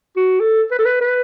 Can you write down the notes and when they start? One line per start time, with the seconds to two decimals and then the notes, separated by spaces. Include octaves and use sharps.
0.16 F#4
0.40 A4
0.71 B4
0.79 A4
0.85 B4
1.01 B4